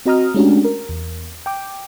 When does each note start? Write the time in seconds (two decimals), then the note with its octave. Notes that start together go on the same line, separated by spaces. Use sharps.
0.06 C4 F#4 D#5 A#5 D#6 F6
0.34 G#3 A3 C#4 D4 F#4 G4
0.65 A#4
0.89 E2
1.46 G5 D6